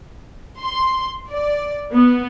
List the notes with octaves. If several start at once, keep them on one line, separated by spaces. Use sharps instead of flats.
C6
D5
B3